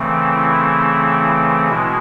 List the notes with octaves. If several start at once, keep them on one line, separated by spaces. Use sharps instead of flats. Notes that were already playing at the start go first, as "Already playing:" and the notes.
Already playing: C#3 E3 A3 C4
E4
B2 G#3 E4